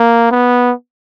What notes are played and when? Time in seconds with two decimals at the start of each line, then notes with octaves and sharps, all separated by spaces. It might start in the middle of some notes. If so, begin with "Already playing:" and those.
Already playing: A#3
0.31 B3